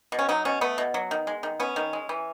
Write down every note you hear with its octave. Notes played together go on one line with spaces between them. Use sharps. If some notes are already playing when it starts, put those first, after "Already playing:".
B2
C#4
F#3 D#4
B2 C#4
A3 B3
B2
F#3
D#3
G#3
D#3
B3 C#4
D#3
G#3
E3